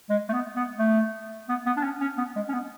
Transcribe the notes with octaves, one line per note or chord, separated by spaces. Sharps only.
G#3
A3
B3
B3
A3
B3
B3
D4
C#4
C#4
B3
G#3
C#4
B3